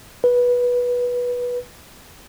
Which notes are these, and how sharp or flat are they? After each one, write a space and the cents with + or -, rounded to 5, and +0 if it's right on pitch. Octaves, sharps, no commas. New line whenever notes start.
B4 -15